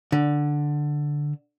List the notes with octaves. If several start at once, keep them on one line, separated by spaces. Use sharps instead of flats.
D3